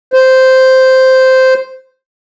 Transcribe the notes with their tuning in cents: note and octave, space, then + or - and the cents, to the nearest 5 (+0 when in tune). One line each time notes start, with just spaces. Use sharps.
C5 -5